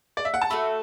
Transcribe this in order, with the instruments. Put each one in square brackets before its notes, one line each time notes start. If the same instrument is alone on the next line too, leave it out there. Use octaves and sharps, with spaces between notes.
[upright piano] D5
E5
F#5
A5
[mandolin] A3 F#4 A4 [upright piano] B5